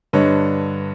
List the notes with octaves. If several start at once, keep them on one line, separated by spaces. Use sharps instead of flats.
G2 D3 B4 C#5 D#5